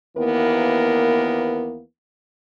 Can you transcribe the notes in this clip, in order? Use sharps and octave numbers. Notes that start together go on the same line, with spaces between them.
D#2 E3 A#3 B3 A#4